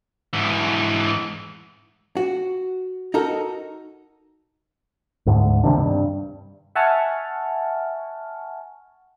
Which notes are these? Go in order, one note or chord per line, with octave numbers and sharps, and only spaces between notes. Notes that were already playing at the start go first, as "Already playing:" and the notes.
G#2 E3
F#4
D#4 F#4 A4 A#4
D2 G#2 D3
C3 D#3 D4
G2
E5 F#5 G#5 A5 C#6 F6